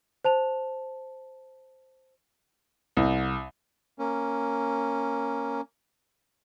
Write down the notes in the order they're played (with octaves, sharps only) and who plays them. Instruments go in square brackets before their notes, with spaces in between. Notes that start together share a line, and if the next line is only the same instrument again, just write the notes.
[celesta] C5 A5 F7
[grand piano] C2
[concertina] A#3 C#4